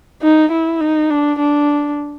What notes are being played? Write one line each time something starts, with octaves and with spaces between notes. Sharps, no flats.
D#4
E4
D#4
D4
D4